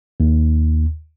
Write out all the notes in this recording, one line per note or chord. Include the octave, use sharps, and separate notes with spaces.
D#2